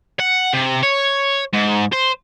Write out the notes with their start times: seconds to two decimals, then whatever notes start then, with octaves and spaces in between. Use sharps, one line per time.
0.20 F#5
0.53 C3
0.83 C#5
1.53 G#2
1.93 C5